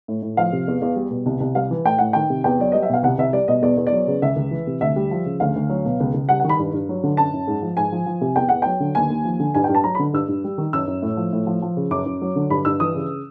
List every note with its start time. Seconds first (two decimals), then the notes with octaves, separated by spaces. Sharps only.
0.08 A2
0.22 A2
0.37 F3 F5
0.53 C3
0.68 E2
0.82 E2
0.96 G3
1.11 B2
1.26 C2
1.40 C2
1.55 G3 F5
1.71 E3
1.85 A2 G5
1.98 A2 F#5
2.13 D#3 G5
2.30 C3
2.44 E2 G5
2.59 F#3 D5
2.72 G3 D#5
2.83 E5
2.89 B2 F5
3.03 C2 F#5
3.18 C2 E5
3.33 G3 D5
3.48 B2 D#5
3.62 E2 D5
3.77 E2
3.87 D5
3.92 F#3
4.07 C#3
4.22 C#2 E5
4.36 C#2
4.51 E3
4.67 C3
4.81 D2 E5
4.96 G3
5.11 F3
5.26 C#3
5.40 D2 F5
5.56 D2
5.69 F#3
5.85 B2
6.00 C#2
6.14 C#2
6.29 G3 F#5
6.40 F#5
6.44 D#3
6.49 B5
6.59 G2
6.73 G2
6.89 F#3
7.04 D3
7.17 F#2 A5
7.33 F#2
7.47 G#2
7.62 F3
7.77 G#2 G#5
7.92 F3
8.06 F3
8.21 C3
8.36 E2 G5
8.49 E2 F#5
8.62 F#3 G5
8.80 D3
8.95 D#2 G#5
9.10 D#2
9.25 F3
9.40 D3
9.54 G2 G#5
9.64 G5
9.69 G2
9.75 A5
9.84 F#3 A#5
9.95 B5
9.99 D3
10.13 G2 E6
10.28 G2
10.44 G3
10.58 D#3
10.73 F#2 E6
10.87 F#2
11.02 A2
11.17 F3
11.33 A2
11.47 F3
11.62 F3
11.77 C#3
11.91 F#2 D6
12.06 F#2
12.22 F#3
12.36 D3
12.50 G2 B5
12.65 G2 E6
12.80 E3 D#6
12.95 C#3